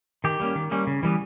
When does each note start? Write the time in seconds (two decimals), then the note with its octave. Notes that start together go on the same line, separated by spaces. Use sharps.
0.24 D#3 G4
0.40 G3 A#3 C#4
0.56 D#3
0.71 G3 A#3 C#4
0.87 C#3
1.03 E3 G3 B3